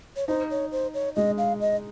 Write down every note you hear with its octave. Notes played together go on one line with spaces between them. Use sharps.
C#5
D#4 C5
C#5
C5
C#5
G#3 D#5
F5
D#5